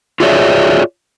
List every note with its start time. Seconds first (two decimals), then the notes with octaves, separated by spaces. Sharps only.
0.20 F4 F#4 G#4 C#5 D5 E5